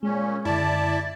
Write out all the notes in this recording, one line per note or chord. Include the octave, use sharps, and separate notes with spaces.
A#2 G#3 C#4
F#2 D3 E4 D5 A5